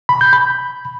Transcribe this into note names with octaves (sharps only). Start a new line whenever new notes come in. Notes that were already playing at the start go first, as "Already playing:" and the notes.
B5
G6
B5